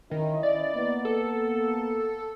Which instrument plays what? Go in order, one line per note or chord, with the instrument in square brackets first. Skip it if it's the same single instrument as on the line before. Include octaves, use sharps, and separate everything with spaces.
[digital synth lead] D#3 [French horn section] C#4 E4 D#5
[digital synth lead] D5
[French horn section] A#3 B3
[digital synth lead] A4